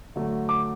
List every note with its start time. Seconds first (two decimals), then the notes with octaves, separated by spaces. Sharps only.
0.16 D3 F#3 A3
0.49 D6